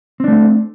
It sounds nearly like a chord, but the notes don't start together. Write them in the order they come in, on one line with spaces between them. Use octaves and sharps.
C4 D4 A3